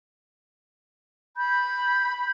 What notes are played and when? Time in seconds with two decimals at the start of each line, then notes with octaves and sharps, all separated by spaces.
1.37 B5 G6